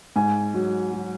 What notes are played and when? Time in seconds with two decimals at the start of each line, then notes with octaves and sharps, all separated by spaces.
0.16 G#2 G#5
0.54 F#3
0.93 F#3